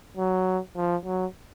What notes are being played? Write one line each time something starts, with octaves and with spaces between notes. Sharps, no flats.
F#3
F3
F#3